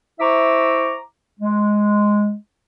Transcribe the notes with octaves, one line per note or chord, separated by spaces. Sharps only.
E4 C5 E5 A#5 C#6 D6
G#3